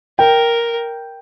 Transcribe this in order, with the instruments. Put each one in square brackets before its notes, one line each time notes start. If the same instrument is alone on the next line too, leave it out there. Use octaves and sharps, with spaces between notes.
[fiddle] A#4 [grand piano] G5